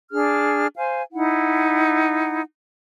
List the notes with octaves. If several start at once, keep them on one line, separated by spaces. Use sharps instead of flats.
D4 G#4 F6
C5 F5 G#5
D#4 E4 F#5